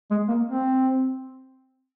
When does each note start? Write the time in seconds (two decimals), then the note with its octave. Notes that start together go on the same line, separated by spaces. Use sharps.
0.11 G#3
0.28 A#3
0.45 C4